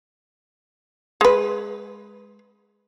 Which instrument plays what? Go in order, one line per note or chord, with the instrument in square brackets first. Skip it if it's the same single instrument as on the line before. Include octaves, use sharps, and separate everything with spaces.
[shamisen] G#3 B4